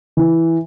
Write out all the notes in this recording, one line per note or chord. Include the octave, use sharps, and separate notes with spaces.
E3